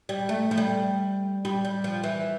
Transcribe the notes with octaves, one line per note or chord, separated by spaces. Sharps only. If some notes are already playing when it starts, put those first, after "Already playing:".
G3
A3
F3
G3
G3
G3
F3
E3